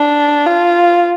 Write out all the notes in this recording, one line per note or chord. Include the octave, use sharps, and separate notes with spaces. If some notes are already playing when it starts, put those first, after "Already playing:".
Already playing: D4
F4